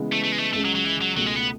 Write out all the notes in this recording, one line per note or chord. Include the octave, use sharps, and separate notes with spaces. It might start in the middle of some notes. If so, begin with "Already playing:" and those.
Already playing: C#3 E3 G#3 B3
A3
A3
G#3
A3
C#2 C#3 G#3 A3
F#3
F#3
E3
F#3
C#2 B2 F#3 A3
G#3
B3